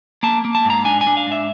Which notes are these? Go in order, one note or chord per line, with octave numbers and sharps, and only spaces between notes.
A#3 A5
A#3
A5
G#2 A#5
D4 G#5
G#5
D4
F5
G#2 E5